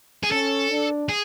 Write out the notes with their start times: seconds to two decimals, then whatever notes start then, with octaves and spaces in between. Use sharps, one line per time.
0.23 G#4
0.31 C#4 A4
0.70 D4
1.09 G#4